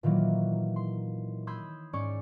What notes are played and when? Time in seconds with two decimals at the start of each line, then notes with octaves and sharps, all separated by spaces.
0.03 A#2 D#3 E3 F#3 A#3
0.76 C6
1.47 B5 C6 D#6 E6 G6 G#6
1.93 G#2 C#4 D5 C#6 D6 D7